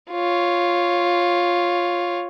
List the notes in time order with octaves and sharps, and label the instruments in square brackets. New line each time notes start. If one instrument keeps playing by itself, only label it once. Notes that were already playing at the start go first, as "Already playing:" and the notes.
[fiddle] F4 C#5